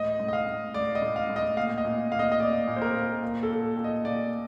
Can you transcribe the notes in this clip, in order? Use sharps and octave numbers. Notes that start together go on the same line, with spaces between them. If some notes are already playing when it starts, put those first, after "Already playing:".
Already playing: A2 D#5
A2
D#5
F5
A2
A2 D5
D#5
A2
F5
A2
D#5
A#2 F5
D#5
A#2
A#2 F5
D#5
D#5
A#2 D5
A#2
C5
A#4
A#2
A#2
A4
A#2
A#2
D#5
A#2 D5